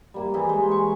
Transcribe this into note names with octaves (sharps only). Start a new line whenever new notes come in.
G3 A#3 E4
E3 G3 E4 G#4
G#3 C5
C#6